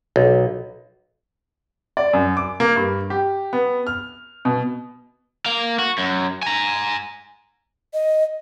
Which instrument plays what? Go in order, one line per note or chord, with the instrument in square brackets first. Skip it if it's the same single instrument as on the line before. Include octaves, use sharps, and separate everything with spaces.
[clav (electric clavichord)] B1
[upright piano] D5
F#2
D6
A#3
G2
G4
B3
F6
B2
[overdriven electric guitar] A#3 F5
F#4
F#2
G#5 A#5
[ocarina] D#5